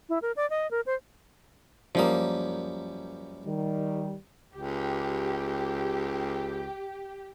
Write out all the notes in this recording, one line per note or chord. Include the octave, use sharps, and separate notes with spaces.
E4
A#4
D5
D#5
A#4
C5
F#2 F3 G3 A#3 D#6
D#3 G3
C#2 G4